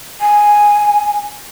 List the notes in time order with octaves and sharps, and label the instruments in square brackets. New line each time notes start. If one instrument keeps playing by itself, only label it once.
[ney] G#5